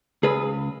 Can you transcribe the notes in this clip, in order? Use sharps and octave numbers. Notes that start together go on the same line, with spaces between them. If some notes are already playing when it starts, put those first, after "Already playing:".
C#2 G#4 B4